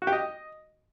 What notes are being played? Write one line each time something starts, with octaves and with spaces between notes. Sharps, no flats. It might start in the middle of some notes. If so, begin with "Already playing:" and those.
F#4
G4
D#5